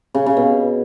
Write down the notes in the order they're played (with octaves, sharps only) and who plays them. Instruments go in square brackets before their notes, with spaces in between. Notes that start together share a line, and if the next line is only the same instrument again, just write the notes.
[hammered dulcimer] C#3
C#3
B2